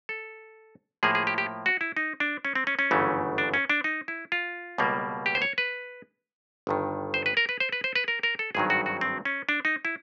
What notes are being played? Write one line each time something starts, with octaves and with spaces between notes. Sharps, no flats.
A4
A2 F3 A#3 G#4
G#4
G4
G4
F#4
E4
D#4
D4
C#4
C4
C#4
C#4
G1 F#2 C#3 E3 A3
D4
C#4
D4
D#4
E4
F4
C#2 B2 G3 A#3
G4
C5
C#5
B4
G1 G2 D#3
C5
B4
A#4
B4
C5
B4
C5
B4
A#4
A#4
A4
G#1 G2 D#3 F#3 G#4
F#4
F#4
C4
C#4
D4
D#4
E4